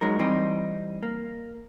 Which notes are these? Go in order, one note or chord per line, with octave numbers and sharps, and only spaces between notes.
F#3 G#3 D#4 A#4
E3 G3 C4 D#4
A#3